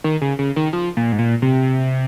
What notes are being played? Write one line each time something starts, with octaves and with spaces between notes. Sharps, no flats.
D#3
C#3
C#3
D#3
F3
A#2
G#2
A#2
C3